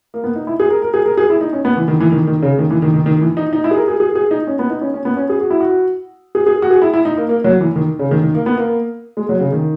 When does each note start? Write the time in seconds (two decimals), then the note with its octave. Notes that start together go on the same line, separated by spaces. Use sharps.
0.14 A#3
0.24 B3
0.36 D#4
0.47 E4
0.60 G#4
0.70 A#4
0.82 A#4
0.94 G#4
1.06 A#4
1.17 G#4
1.30 E4
1.41 D#4
1.53 C#4
1.65 B3
1.77 E3
1.88 D#3
2.00 E3
2.12 D#3
2.27 D#3
2.42 C#3
2.59 D#3
2.71 E3
2.82 D#3
2.94 D#3
3.06 D#3
3.21 E3
3.37 D#4
3.53 D#4
3.64 E4
3.71 G#4
3.76 A#4
3.88 G#4
4.00 G#4
4.15 G#4
4.31 D#4
4.47 C#4
4.59 B3
4.70 D#4
4.81 C#4
4.94 C#4
5.05 B3
5.17 C#4
5.30 G#4
5.41 F#4
5.50 E4
5.61 F#4
6.35 G#4
6.46 G#4
6.62 F#4
6.71 G#4
6.82 E4
6.94 E4
7.05 D#4
7.17 A#3
7.29 A#3
7.44 F#3
7.61 E3
7.76 D#3
7.99 C#3
8.11 D#3
8.23 D#3
8.35 A#3
8.46 B3
8.57 A#3
9.17 G#3
9.29 F#3
9.40 C#3
9.52 D#3